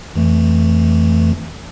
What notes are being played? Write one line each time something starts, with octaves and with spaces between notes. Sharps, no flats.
F2 E3 A3